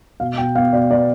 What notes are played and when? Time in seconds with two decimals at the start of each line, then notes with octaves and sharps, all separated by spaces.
0.20 B2 F5
0.38 B2 G5
0.55 B3 F5
0.73 B2 D5
0.91 B3 D5